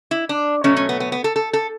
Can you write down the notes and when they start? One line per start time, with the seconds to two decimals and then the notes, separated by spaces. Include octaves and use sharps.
0.11 E4
0.29 D4
0.64 B2 F#3 A3 C#4
0.76 C#4
0.89 B3
1.00 B3
1.12 B3
1.24 A4
1.36 A4
1.53 A4